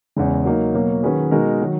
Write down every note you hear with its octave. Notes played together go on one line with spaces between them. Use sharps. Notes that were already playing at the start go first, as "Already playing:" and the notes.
E2 C#3 G#3
F#3 A#3 D#4 A#4
B2 F#3 A#3
D#3 F#3 C#4 G#4 B4
B2 G#3 D#4 F#4 A#4
D#3 F#3